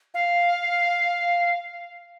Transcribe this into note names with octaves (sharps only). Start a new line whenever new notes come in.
F5